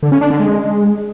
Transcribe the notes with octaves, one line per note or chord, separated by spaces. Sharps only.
D3
C#4
D4
D3
G#3